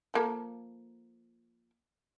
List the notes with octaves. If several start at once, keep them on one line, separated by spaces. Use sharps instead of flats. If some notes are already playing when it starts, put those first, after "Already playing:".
F3 A#3 A4